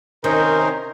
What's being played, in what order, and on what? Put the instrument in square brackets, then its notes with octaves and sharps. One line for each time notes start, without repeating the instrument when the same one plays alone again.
[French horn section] C3 A#4 [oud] D#3 [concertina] C#4 D#4 C5